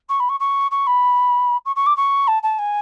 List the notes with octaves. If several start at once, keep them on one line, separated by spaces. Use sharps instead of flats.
C#6
B5
C#6
C#6
C#6
B5
C#6
C#6
D6
C#6
A5
A5
G#5